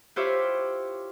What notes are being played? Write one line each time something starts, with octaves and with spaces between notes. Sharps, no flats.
E4 F4 G4 C5 C#5 E5